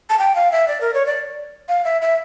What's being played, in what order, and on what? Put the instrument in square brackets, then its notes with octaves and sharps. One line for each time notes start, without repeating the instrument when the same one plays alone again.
[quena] A5
G5
F5
E5
D5
A#4
C#5
D5
F5
E5
E5